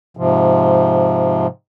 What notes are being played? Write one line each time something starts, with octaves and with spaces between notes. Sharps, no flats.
G#2 C3 F3